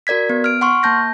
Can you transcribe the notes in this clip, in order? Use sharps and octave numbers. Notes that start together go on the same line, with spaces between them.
F#4 A#4 D5 G#6 B6
B3
F6 D7
F#5 C6 C#6 F6
A#3 A5 G6 A#6